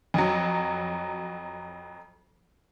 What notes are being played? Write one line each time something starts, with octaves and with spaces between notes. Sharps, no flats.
F2 F#3